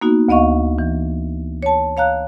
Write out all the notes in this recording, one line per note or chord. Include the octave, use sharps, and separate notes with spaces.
A#3 B3 D#4 F#4
D2 B3 D#5 F5 C#6
E3
C#5 A5
C#5 F5 A#5 F#6